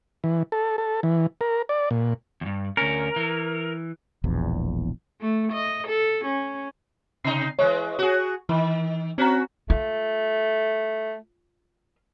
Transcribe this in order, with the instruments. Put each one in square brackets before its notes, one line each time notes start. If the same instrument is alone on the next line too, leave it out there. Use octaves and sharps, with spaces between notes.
[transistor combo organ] E3
A4
A4
E3
A#4
D5
A#2
[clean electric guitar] E2 G2
[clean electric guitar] D2 C#4 [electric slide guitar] A#4
[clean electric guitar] E3
[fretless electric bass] E1 A#1 E2
[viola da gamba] A3
D#5
A4
C#4
[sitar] C3 D#4 [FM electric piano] C7
[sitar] E3 G#3 [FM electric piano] C#5
[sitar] F#4 G#4
[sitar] D#3 [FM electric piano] E3
[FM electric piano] C4 A#5 [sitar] C#4 F#4
[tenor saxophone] A3 [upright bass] F4